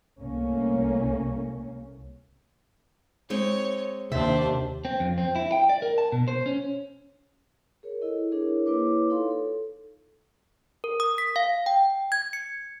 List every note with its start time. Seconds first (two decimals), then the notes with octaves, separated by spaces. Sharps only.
0.18 C2 A3 A#3 C#4
3.30 G#3 C4 D#4 C#5
4.12 D#2 C3 D4 C5 E5
4.85 C4
5.00 F2
5.18 C4
5.36 E4
5.52 G5
5.69 D5
5.82 A#4
5.98 A5
6.12 B2
6.28 C5
6.46 C#4
7.83 G#4 A#4 C#5
8.01 E4 A4 D#5
8.31 D4 E4 G#4 A#4 C#5
8.66 A#3 E4 B4 C#5 D6
9.10 D#4 F4 A4 C#5 F5 C6
9.31 A4
10.84 A#4
11.00 D#6
11.18 B6
11.36 F5
11.66 G5
12.12 G#6
12.33 C#7